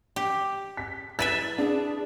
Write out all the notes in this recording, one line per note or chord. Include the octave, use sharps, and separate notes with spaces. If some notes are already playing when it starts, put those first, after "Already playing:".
G4
B6
E4 B4 E5 A6
D4 G#4